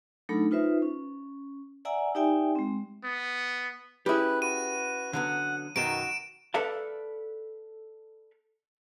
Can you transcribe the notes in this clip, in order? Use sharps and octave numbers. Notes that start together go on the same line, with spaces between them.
F#3 A3 D4 D#4 A4 B5
D#4 F4 B4 C5 E5
C#4
D5 E5 F#5 G#5 A#5 E6
D#4 G4 D5 E5 G5 G#5
G#3 C4
B3
C#4 E4 G4 G#4 B4
F#4 B4 D#7
D3 F#3 B3 F#5
F#2 B2 D#3 F#4 D7 E7
A4 B4 D5 E5 F5 A5